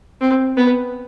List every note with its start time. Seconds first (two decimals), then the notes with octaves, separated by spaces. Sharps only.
0.21 C4
0.57 B3